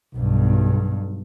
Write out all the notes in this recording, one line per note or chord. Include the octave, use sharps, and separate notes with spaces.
B1 G2